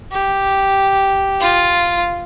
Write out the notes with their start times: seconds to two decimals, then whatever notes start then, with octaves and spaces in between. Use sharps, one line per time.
0.12 G4
1.39 F4